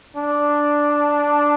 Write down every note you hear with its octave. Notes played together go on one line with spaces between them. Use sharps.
D4